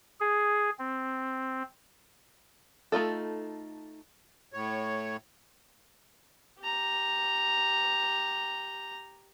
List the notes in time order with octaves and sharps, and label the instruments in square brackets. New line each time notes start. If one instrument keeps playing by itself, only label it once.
[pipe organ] G#4
C4
[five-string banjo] A3 D#4 F4 A4
[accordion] A2 C#5
[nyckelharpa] G4 A#5